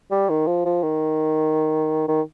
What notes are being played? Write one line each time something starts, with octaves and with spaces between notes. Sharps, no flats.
G3
D#3
F3
F3
D#3
D#3